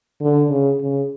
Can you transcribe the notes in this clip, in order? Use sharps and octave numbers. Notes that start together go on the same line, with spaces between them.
D3
C#3
C#3